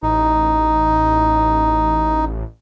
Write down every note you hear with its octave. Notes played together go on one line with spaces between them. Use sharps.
A1 D#4